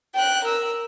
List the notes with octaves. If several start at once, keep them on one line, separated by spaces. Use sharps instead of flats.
G5 F#6
A#4 E6